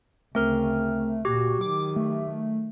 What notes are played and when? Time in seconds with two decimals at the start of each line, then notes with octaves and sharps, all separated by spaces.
0.35 D2 C#3 A3 C4 A#4 F6
1.25 A#2 F#4 G4
1.61 D#3 F#3 D6
1.96 A3